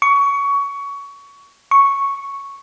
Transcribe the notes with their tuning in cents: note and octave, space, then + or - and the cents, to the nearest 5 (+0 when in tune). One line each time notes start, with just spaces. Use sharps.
C#6 +20
C#6 -5